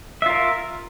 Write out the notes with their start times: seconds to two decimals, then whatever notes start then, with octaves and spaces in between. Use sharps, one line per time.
0.22 E5
0.26 F4
0.30 A#4